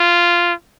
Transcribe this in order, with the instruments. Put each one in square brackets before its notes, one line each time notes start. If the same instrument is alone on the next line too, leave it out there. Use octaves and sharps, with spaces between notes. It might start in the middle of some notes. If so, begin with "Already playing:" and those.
Already playing: [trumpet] F4